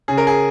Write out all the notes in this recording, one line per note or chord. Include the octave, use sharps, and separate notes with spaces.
C#3 G#4
A#4
G#4